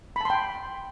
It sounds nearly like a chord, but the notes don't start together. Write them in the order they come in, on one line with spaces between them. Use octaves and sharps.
B5 A5 C6 G5